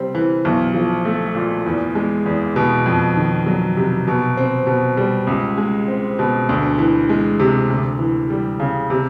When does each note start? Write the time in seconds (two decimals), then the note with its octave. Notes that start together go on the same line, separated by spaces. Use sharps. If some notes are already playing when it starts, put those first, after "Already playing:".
Already playing: C3 G3 C4
0.15 E3
0.45 B1
0.74 F3
1.05 A3
1.35 A#2
1.66 E2
1.95 G#3
2.26 E2
2.56 B2
2.86 F2
3.17 D#3
3.46 F#3
3.77 C3
4.07 B2
4.37 C4
4.67 B2
4.97 G3
5.27 C#2
5.58 G#3
5.88 C4
6.19 B2
6.49 D2
6.78 E3
7.09 G#3
7.40 C3
7.70 D2
7.99 E3
8.30 G3
8.60 C#3
8.90 C3